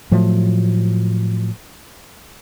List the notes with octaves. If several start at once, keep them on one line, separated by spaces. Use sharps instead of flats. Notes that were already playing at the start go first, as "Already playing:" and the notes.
A2 F3 F#3 A3